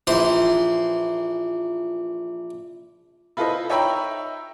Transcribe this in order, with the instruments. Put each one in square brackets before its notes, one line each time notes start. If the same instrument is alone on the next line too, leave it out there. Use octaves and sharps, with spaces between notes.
[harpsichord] A#1 E3 C5 C6
[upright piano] E4 F4 A4 B4 C5 D#5
D#4 C#5 E5 G5 A#5 B5